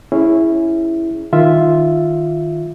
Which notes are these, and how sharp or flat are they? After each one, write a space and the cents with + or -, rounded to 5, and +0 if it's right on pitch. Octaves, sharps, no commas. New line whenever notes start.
C#4 +0 E4 +0 G#4 +0
D#3 +0 F4 +0 E5 +0